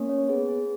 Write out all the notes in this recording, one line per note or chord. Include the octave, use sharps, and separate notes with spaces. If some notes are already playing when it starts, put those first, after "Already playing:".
Already playing: A#3 C#4
C#5
B3 G#4
G#4